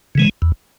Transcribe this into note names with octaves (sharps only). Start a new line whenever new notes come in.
C#3 E3 G#3
E2